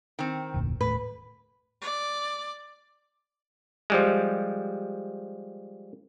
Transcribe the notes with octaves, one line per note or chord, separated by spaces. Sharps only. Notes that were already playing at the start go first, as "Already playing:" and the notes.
D#3 C4
F1 D2 A#2
D#1 A2 B4
D5
F3 G3 G#3